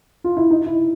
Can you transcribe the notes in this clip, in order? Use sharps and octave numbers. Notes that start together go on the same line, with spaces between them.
F4
E4
D#4
E4